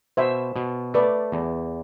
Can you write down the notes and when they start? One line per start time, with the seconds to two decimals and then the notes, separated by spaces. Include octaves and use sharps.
0.17 B2 C5 E5
0.56 B2
0.94 A3 B4 D5
1.32 E2